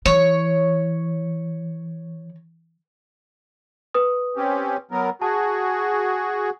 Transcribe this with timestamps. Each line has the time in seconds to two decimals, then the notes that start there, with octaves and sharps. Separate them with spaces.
0.06 E3 C#5
3.94 B4 D#6
4.36 C4 C#4 G4
4.91 F#3 B3 A#4
5.22 F#4 G#4 A5